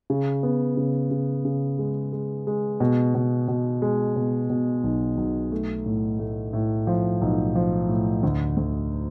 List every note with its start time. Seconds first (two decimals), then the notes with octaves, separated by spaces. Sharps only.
0.10 C#3
0.43 B3
0.77 C#3
1.11 C#3
1.45 C#3
1.79 G#3
2.13 G#3
2.47 G#3
2.80 B2
3.15 B2
3.48 B2
3.82 G#3
4.16 B2
4.50 B2
4.84 B1
5.17 B1
5.52 A3
5.86 A2
6.19 A3
6.53 A2
6.87 F3
7.21 B1
7.55 F3
7.89 A2
8.23 D2
8.57 D2